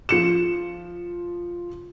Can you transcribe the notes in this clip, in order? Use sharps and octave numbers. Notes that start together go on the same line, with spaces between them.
F3 C#7 E7